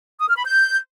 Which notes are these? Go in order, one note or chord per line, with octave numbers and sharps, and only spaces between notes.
D#6
F6
B5
G6